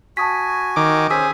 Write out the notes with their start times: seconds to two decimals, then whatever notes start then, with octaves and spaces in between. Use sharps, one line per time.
0.17 F#4 G#5 A5 D#6 B6
0.76 D#3 D6
1.10 C#4 G#4 C5 E6 B6